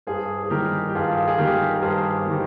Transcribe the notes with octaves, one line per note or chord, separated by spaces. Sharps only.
G2 G#4 C5
G#4
D#3 G3 G4 A#4
G4
G2 F4 G#4
G#4
D#3 G3 G4 A#4
A#4
G2 G#4 C5
D#3 G3